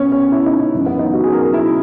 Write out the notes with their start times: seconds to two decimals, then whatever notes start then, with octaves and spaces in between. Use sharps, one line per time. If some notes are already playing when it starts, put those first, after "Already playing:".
Already playing: B2 B3 C#4
0.12 C#4
0.32 E4
0.46 D#4
0.59 C#4
0.73 F#1 F#2 C#3 E3 C#4
0.86 B3
0.99 D#4
1.13 F#4
1.24 G#4
1.33 A#4
1.54 E4